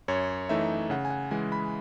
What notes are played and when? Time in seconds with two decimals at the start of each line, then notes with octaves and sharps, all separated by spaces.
0.08 F#2 C#5
0.49 E3 A3 D#4 E5
0.90 C#3 F#5
1.05 G#5
1.10 F#5
1.31 E3 G#3 G#5
1.52 B5